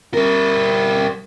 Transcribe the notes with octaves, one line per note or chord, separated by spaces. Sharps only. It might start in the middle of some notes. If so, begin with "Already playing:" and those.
G3 A#4